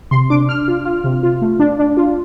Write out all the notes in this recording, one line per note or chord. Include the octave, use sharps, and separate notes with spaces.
C3 C6
D4 D6
D4 F6
F4
F4
C3
F4
A3
D4
D4
F4